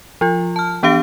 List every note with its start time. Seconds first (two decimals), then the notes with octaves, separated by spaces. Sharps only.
0.21 F3 F4
0.56 A5 F6
0.83 E3 B3 D4 G4 F5 D7